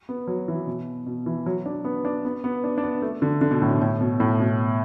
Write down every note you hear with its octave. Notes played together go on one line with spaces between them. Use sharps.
B3
F#3
E3
B2
B2
E3
F#3
D4
B3
D4
B3
B3
D4
D4
B3
A3
D3
D3
B2
A2
B2
A2
B2
A2
B2